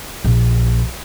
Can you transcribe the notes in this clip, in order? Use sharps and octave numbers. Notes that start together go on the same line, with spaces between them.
A#1